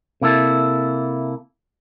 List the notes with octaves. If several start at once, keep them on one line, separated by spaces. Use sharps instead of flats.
C3 A#3 E4 A4